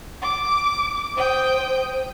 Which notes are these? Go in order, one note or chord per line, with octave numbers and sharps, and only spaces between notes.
D6
C5 G5 D#6